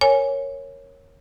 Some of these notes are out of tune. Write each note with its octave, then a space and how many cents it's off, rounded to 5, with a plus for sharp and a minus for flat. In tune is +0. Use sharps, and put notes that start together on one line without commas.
A#4 +0 C#5 -10 G#5 +0